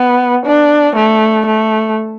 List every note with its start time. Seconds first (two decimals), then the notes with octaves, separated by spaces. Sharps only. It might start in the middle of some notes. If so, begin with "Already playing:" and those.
Already playing: B3
0.46 D4
0.96 A3
1.47 A3